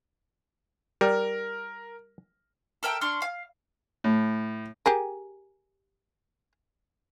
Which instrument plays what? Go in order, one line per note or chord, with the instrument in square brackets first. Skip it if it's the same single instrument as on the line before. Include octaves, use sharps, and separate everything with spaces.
[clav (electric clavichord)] G3 [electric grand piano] A#4
[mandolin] A4 A#4 E5 G5
D4 C6 C#6 F6
F5
[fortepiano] A2
[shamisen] G4 G#4 A#4